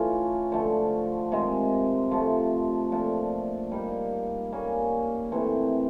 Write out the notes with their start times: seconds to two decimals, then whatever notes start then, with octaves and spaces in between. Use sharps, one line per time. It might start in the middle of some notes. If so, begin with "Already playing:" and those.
Already playing: E3 A3 C#4 F4
0.52 D3 F3 A3
1.32 C3 D#3 G#3
2.11 C3 F3 A3
2.92 A#2 F3 A3 D4
3.72 G3 A#3 D#4
4.52 G3 A#3 C#4
5.31 C3 E3 A3 C4